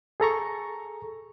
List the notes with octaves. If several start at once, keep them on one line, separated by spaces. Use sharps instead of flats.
G#4 A4 A#5 C#6